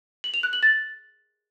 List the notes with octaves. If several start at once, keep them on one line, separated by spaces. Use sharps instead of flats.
F#7
F7
F#6
F#7
A6